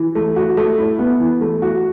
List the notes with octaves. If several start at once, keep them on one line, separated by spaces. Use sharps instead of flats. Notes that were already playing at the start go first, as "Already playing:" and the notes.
Already playing: E3
A3
F#4
A3
E4
B3
E3
A3
F#4